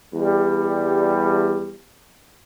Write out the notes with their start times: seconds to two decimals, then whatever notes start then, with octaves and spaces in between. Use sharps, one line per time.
0.14 E2 G3